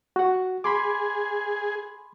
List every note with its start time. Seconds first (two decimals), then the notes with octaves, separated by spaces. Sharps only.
0.16 F#4 F#5
0.64 G#4 B5 C6 D6